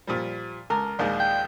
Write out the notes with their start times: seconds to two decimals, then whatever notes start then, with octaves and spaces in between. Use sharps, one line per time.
0.07 A#2 F3 G3
0.70 C#2 A#4 A5
0.99 A#1 D#2 G#3 D5 F5 G6
1.20 G5